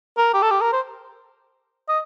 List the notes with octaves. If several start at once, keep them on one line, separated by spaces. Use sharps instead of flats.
A#4
G4
A4
G4
A#4
C5
D#5